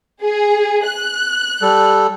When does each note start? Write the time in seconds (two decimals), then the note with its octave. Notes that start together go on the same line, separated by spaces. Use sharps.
0.22 G#4
0.85 F#6
1.62 G3 A4